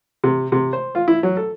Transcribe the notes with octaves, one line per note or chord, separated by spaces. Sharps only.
C3
C3
C5
F4
E4
F#3
A4